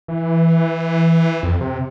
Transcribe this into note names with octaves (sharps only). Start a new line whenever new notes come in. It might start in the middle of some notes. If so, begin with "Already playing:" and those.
E3
F2
C3